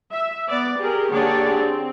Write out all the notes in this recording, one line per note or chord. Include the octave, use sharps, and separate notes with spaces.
E5
B3 D5
G4 G#4 A#4
D3 A#3 G4 G#4 C#5 D5
C4